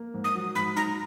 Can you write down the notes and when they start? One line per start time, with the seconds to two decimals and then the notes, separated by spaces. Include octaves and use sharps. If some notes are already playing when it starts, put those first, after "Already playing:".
Already playing: A#3
0.14 G#2
0.24 D#6
0.35 F#3
0.55 G#2 B5
0.76 D#4 A#5